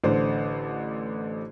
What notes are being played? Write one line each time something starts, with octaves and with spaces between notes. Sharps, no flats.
A1 D3 C5